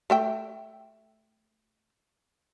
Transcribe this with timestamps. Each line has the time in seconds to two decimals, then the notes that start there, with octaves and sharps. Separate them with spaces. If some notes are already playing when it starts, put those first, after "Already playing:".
0.10 A3 E5 G5